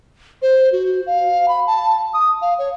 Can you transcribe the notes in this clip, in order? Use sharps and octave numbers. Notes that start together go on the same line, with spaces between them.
C5
F#4
F5
B5
A5
D#6
F5
C#5